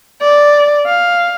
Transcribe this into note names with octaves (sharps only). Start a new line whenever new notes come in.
D5
F5